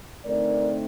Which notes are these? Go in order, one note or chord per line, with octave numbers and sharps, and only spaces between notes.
D3 A3 C4 D#4 A#4 D5